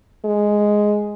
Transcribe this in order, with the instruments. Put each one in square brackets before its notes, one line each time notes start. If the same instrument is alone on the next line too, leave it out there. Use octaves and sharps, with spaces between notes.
[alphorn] G#3